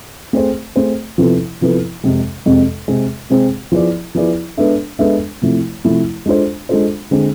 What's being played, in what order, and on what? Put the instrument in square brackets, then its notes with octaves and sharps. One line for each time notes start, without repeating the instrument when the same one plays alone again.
[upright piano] A3 C4 G#4 C5
A3 C4 G#4 C5
C3 F3 B3 E4 A4
C3 F3 B3 E4 A4
F2 C3 G#3
F2 C3 G#3
C3 G#3 C4 G#4
C3 G#3 C4 G#4
F3 B3 E4 G#4 D5
F3 B3 E4 G#4 D5
G#3 B3 D4 A4 E5
G#3 B3 D4 A4 E5
C3 F3 A3 E4
C3 F3 A3 E4
G#3 D4 F4 A4 C5
G#3 D4 F4 A4 C5
D3 G#3 C4 G#4